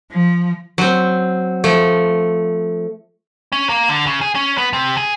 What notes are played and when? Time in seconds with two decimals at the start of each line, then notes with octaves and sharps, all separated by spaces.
0.11 F3
0.78 F#3 C4
1.64 F3 A3
3.52 C#4
3.69 A#3
3.89 D3
4.07 C#3
4.21 G#4
4.35 C#4
4.58 B3
4.73 C3
4.97 G#4